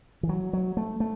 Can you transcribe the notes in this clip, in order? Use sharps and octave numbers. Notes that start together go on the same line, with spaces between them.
E3
F#3
F#3
A3
A3